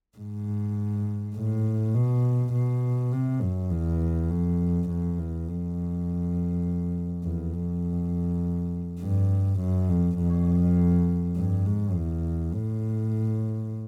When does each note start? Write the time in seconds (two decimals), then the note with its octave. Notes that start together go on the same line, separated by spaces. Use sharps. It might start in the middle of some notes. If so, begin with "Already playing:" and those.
0.18 G#2
1.35 A2
1.94 B2
2.53 B2
3.12 C3
3.41 F#2
3.71 E2
4.30 F2
4.89 F2
5.19 E2
5.48 F2
7.24 E2
7.54 F2
9.01 G2
9.60 F#2
9.89 F2
10.18 F2
11.36 G2
11.66 G#2
11.95 E2
12.54 A2